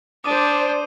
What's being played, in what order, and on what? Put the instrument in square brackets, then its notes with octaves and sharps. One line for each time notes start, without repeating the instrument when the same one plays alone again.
[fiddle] D4 [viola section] C5 D5 [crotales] D6 D#6 D#7